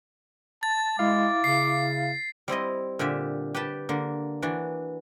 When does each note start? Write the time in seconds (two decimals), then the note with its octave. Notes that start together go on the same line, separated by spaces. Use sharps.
0.63 A5 A6
0.99 G#3 E4 F5 D6
1.44 C#3 C7
2.48 G3 C4 E4 D#5
2.99 A#2 D3 G4 E5
3.54 G4 B4 G5 A5
3.89 D3 A#3
4.42 E3 D4 F#4 D5